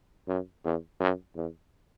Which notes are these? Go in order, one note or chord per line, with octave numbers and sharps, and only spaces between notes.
F#2
E2
F#2
E2